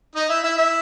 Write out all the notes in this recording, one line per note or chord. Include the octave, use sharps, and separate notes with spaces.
D#4 D#5
E4 E5
E4 E5
E4 E5